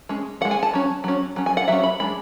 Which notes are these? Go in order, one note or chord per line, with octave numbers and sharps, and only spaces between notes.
G#3 C#4
C#4 F#5
G#3
G#5
A5
F#3 C#4
F#3 C#4
F#3 C#4
G#5
F#5
F#3 C#4 E5
B5
G#3 D4 B5